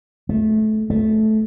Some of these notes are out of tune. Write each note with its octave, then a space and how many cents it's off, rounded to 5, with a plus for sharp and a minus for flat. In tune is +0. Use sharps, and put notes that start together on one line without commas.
A3 -25
A3 -15